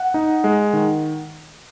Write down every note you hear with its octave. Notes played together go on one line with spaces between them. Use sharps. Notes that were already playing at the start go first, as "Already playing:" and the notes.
Already playing: F#5
D#4
G#3
D#3